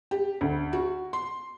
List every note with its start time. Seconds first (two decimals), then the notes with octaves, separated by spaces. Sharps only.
0.11 G4
0.41 D2
0.73 F#4
1.13 C6